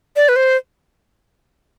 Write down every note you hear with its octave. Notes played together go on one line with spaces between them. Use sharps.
D5
B4
C5